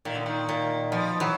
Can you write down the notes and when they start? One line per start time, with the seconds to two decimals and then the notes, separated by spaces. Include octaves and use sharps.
0.05 A#2 D#3
0.15 D3
0.26 D#3
0.49 A#2
0.92 B2 F3
1.20 E3 F#3